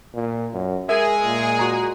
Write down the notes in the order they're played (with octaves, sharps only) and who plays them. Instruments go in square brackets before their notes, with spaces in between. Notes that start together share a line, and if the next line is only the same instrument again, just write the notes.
[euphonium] A#2
F#2
[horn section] G#3 G#4 [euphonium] A#4 [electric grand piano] E5
[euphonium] A#2
[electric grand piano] F#4 A#5